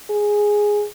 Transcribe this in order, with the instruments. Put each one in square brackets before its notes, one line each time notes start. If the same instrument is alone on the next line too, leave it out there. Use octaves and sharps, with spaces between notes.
[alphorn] G#4